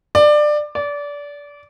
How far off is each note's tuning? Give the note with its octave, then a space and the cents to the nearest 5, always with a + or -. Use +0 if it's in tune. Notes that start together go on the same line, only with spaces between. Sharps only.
D5 +20
D5 -25